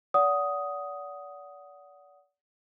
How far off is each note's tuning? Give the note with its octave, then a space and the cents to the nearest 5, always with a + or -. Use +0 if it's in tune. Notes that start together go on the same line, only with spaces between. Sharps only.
D5 -40 F#5 +0 D#6 +5